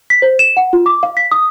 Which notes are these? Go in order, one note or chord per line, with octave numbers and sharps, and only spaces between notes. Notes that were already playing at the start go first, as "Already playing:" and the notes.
B6
C5
E7
F#5
F4
D6
F5
B6
D#6